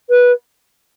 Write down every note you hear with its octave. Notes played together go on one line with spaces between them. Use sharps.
B4